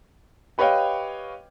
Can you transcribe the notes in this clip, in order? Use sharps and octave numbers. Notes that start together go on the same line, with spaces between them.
G4 B4 C#5 D#5 F5 G5